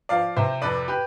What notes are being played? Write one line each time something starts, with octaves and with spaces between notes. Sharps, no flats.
F3 D5 F5
C3 C5 E5
F2 B4 D5
G4 B4